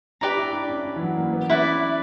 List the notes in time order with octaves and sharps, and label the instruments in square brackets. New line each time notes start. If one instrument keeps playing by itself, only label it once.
[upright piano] D4 [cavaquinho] G4 B4 D5 A#5
[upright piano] E4
D4
C#4
C#4
E3
F#3
A#3
B3
[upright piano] C#4 [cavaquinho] E4 B4 D5